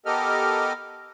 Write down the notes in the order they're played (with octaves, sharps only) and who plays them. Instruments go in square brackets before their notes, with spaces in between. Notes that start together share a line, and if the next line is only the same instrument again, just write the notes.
[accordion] B3 G4 A4 A#4 D#5 F6